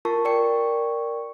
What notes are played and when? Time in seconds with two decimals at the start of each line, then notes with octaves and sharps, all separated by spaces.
0.05 F4 A#4 A5 C#6
0.25 A#4 D5 G5 C#6 C#7